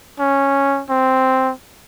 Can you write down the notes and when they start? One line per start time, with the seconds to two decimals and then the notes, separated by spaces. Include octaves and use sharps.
0.19 C#4
0.89 C4